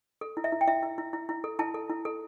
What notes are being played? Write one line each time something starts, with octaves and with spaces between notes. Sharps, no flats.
A4
E4
E5
E4
G5
E4 E5
E4
E4
E4
E4
A4
E4 A5
A4
E4
A4